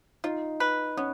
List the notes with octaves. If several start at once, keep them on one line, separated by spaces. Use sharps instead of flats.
D#4 F4
B4
B3 C#4